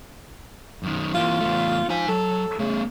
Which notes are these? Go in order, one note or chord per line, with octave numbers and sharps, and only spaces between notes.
F#2 D#3
E3 A#3 F4
E2 A3
F3 D#4 G#5
F#3 A4
C#3 A3 B3